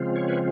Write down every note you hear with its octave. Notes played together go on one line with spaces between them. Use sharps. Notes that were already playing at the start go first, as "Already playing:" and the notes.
Already playing: C#3 F3 G#3 C4 F4
C#5
B4